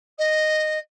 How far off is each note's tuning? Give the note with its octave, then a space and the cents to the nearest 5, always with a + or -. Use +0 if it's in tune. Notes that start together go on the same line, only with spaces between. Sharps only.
D#5 -10